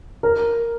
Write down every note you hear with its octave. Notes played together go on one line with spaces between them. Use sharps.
A#4